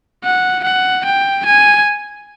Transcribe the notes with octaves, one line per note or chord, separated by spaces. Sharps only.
F#5
F#5
G5
G#5